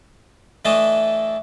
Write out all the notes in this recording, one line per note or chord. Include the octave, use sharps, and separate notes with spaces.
E3 A3 D4 D#5 A5 D#6